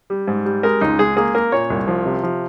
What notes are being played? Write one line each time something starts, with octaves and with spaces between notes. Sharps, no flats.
G3
G#2
G3
G#3 A#4
C#2 D#4
G#3 G#4
A#3 G#4
A#3 A#4
A#2 C#5
C2
F3
C3
F3